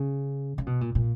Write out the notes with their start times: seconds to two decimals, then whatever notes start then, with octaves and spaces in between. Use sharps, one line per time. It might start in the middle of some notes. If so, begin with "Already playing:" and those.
Already playing: C#3
0.58 C#3
0.67 B2
0.81 A#2
0.95 A#2